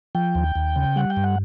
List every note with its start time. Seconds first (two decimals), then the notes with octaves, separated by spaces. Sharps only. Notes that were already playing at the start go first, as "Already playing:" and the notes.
0.15 F3 G5
0.35 D#2
0.55 D#2
0.76 C#3
0.96 G3 F#5
1.10 G5
1.17 G2
1.24 F#5